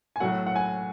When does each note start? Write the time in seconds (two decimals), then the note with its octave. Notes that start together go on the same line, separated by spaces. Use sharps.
0.16 G#5
0.20 A2 F#3 A3 F#5
0.46 F#5
0.56 G#5